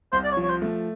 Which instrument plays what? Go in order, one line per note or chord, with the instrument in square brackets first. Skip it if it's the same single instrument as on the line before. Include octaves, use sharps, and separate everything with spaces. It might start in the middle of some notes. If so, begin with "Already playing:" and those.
[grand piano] C2 [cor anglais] C5
[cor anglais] D5
C#5
[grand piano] F3
[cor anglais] C#5
C5
[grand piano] A3